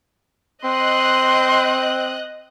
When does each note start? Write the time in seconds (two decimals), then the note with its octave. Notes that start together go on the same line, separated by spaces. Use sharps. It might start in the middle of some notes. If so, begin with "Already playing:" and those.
0.64 C4 D#5 C6 F#6